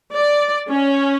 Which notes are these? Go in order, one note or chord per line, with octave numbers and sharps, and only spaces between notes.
D5
C#4